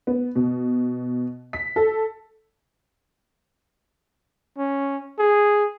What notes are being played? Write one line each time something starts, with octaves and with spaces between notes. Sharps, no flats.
B3
B2
B6
A4
C#4
G#4